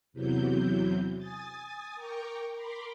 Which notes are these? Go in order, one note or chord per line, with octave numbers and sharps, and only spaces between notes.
E2 C3 E3 F#3 G6
G#5 D#6 A6
A#4 G5 C#6 D6
A#4 B5 C6 D6